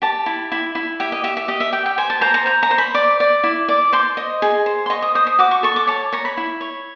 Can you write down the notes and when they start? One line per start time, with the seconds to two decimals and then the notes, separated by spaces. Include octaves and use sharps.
0.02 G4 A5
0.26 E4
0.52 E4
0.75 E4
1.00 G4 E5
1.12 D#5
1.24 G4 E5
1.37 E5
1.48 G4 D#5
1.60 E5
1.73 G4 G5
1.86 G5
1.98 C5 G#5
2.10 A5
2.21 C5 A#5
2.34 A#5
2.46 C5 A#5
2.63 A#5
2.71 C5
2.78 B5
2.94 D5 D6
3.20 D5
3.43 E4
3.68 D5
3.93 C5 C6
4.17 D#5
4.42 G#4
4.66 C5
4.86 C6
4.90 D#5 C#6
5.02 D#6
5.15 C5 D#6
5.27 D#6
5.39 F#4 D6
5.51 C#6
5.63 A4 C#6
5.76 D6
5.87 C#5 A5
6.13 C#5 A#5
6.25 B5
6.37 E4
6.61 C#5